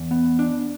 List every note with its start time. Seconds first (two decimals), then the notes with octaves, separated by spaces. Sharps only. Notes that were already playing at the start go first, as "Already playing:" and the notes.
Already playing: E2
0.11 B3
0.39 D4